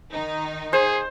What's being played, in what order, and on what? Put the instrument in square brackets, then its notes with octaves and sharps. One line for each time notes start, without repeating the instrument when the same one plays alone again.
[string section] D#3 D#4
[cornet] G#4 [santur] C5